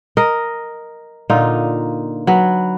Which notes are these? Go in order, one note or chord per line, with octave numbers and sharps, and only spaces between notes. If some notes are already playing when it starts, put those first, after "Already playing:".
A#4 D#5
A#2 D3 D#4 F4
F#3 B4